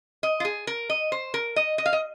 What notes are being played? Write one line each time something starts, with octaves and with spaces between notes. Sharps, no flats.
D#5
F4
G#4
A#4
D#5
C5
A#4
D#5
D#5
F5
D#5